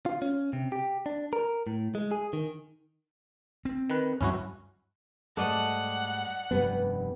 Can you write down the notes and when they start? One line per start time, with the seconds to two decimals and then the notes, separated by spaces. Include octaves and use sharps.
0.06 F4
0.22 C#4
0.53 C3
0.72 G4
1.06 D4
1.33 A#4
1.67 A2
1.95 G#3
2.11 G#4
2.33 D#3
3.65 C4
3.90 D#3 B4
4.21 D2 G2 F#3 C#4 E4 F#4
5.37 G#2 G3 A3 A4 D5 D#5 F#5
6.51 F1 G2 G3 B3